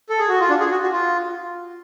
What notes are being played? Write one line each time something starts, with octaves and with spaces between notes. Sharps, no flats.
A4
G#4
F#4
F4
D4
G#4
F#4
F#4
F4